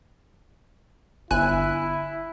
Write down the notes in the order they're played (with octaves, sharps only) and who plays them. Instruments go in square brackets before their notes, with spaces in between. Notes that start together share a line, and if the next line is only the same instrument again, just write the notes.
[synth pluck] G1 G#5 F#6 [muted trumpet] E4